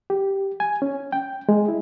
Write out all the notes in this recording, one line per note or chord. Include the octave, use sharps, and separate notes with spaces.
G4
G#5
C#4
G5
G#3
E4